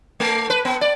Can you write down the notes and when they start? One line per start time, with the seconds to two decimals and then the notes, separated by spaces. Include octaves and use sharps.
0.20 A3
0.50 B4
0.65 B3
0.81 D5